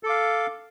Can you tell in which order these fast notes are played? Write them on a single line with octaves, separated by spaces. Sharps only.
A4 D6 F5